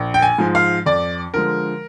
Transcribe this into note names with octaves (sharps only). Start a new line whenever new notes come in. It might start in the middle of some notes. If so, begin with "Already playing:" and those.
Already playing: A#1
G5
G#5
G#2 F3 G#3
F5
F2 D5
D3 F3 G#3 A#4